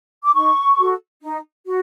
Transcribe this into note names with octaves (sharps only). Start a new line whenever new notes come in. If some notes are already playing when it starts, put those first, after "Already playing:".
D6
D#4 C#6
F#4 A4
D#4
F#4